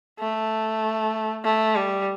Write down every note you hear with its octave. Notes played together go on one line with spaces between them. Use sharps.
A3
A3
G3